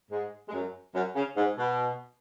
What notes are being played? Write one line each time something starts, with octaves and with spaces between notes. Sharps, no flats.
G#2 G#3
G#3
F#2 F#3
F#2 F#3
C#3
G#2
B2